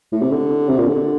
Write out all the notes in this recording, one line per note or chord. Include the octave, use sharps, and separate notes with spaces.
A2
C3
D3
C3
A#2
D3